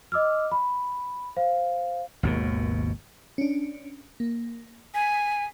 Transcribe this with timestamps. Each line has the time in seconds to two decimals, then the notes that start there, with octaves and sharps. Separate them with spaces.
0.12 D#5 D6 E6 F6
0.51 B5
1.36 C5 F5
2.23 G#1 D#2 B2
3.38 C#4 D4
4.20 A#3
4.94 G#5 B6